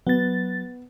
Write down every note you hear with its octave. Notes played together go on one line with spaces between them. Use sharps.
F#3 B3 A6